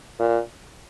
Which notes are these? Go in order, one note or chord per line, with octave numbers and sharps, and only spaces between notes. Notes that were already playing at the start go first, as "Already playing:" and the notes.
A#2